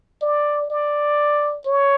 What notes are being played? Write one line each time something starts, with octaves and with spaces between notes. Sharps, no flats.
D5
D5
C#5